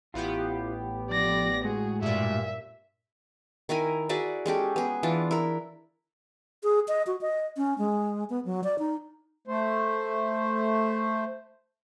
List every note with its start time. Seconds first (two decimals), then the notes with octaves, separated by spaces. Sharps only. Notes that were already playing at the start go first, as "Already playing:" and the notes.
0.14 A1 B3 E4 F4 G4
1.10 F3 D5 A#6
1.64 A2 G#3 F#4 G#4
2.02 G2 A#2 E5
3.69 D#3 E4 A#4 G#5
4.09 F#4 G#4 D5 E5
4.46 G#3 C#4 G4 A4
4.76 B3 G#4
5.03 E3 D4 F4
5.31 E4 A#4
6.63 G#4
6.88 D#5
7.07 F#4
7.21 D#5
7.57 C#4
7.78 G#3
8.30 B3
8.45 F#3
8.64 D5
8.79 D#4
9.47 A3 C5